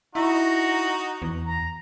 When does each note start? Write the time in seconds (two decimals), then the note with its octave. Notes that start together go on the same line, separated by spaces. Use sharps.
0.15 D#4 E4 F#4
1.22 E2
1.46 A#5